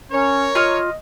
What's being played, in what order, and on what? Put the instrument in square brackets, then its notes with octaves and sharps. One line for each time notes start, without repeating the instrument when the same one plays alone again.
[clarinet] C#4 [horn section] A#4 C#5
[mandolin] F4 F6 [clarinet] D#5